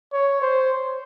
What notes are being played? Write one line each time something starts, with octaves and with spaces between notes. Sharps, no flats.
C#5
C5